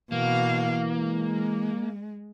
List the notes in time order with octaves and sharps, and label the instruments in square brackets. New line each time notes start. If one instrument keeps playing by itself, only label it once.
[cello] B2 F5 [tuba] E3 [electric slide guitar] A#3
[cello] G#3